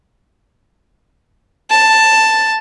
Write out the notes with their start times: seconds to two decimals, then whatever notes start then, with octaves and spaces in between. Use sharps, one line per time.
1.70 A5